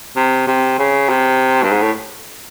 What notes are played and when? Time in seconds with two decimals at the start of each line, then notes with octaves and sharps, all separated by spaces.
0.16 C3
0.47 C3
0.79 C#3
1.09 C3
1.63 G2
1.72 G#2
1.82 A2